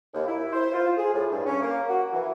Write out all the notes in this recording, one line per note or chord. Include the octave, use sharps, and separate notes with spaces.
D#2
E4
C5
F4
G#4
A2
G2
C#4
A#3
F#4
E3